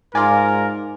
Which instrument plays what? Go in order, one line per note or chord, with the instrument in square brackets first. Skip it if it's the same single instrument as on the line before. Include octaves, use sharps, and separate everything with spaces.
[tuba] G#2 [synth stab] F4 D5 [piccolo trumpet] A#4 [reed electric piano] G#5